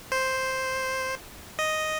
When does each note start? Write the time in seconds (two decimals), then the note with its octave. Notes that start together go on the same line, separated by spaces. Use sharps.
0.12 C5
1.59 D#5